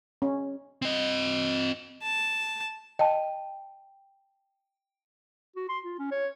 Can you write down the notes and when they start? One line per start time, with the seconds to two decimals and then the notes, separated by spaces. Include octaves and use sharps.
0.22 C#4
0.82 C4 D#5
2.02 A5
2.99 D#5 G5 A5
5.56 F#4
5.69 C6
5.84 F4
5.99 C#4
6.11 C#5